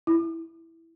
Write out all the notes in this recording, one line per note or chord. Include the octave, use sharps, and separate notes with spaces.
E4